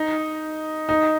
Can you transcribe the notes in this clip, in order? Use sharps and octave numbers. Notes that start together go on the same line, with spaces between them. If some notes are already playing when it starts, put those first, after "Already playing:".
Already playing: D#4
D#4